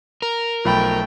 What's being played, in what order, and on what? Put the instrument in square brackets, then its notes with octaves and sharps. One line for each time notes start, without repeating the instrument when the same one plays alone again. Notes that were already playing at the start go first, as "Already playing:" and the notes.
[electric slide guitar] A#4
[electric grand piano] B1 [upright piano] F3 B5 [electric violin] A3 G5